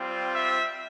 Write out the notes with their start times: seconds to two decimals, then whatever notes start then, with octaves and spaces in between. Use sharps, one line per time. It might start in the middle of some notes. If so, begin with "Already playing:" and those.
Already playing: G3 C4 F4
0.34 E5